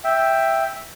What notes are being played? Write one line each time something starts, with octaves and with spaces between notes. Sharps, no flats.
E5 G5